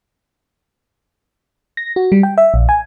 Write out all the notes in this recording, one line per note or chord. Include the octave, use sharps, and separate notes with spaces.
A#6
F#4
G3
G5
E5
A#1
G#5